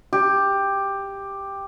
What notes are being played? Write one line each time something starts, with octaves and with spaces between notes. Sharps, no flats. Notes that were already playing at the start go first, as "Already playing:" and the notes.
G4